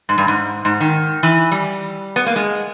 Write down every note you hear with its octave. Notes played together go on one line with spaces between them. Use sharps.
G#2
G2
G#2
G#2
D#3
E3
G3
B3
A#3
G#3